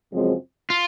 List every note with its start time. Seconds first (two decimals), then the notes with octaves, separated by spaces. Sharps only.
0.12 F#2 C#3 F3 G#3 C4
0.70 F4